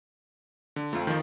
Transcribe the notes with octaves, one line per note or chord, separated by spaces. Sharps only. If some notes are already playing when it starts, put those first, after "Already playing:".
D3
F2 A3
D#3 F3